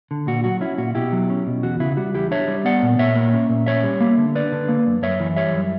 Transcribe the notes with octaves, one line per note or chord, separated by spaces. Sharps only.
D3
A#2 F#4
F#3 F#4
C#4 E4
A#2 F#4
B2 E4 G4
F#3
C#4
B2
E2 F#4
C#3 E4
G3 F#4
E2 E4 G4
D4 C#5 E5
G3
B3 D5 F#5
A#2
A#2 C#5 E5
A#3
C#4
A#2
C#4 C#5 E5
G3
A#3
D3
D4 B4 D5
D3
A#3
F#2
F#2 C#5 E5
E3
G3 C#5 E5
F#2